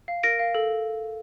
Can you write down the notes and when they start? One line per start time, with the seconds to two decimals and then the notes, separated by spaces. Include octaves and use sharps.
0.08 F5
0.23 A#4 A#6 D7
0.39 F5
0.55 A4